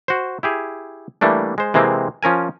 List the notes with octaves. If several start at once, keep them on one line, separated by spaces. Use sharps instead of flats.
F#4 C5
E4 G4 G#4
E3 G3 A3 A#3 D4
G#3 C5
C3 E3 G#3 A#3 C4
F3 C#4 A#4 G#5